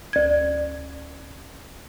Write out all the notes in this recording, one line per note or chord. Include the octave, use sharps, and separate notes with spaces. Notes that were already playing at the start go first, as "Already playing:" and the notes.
D2 G#6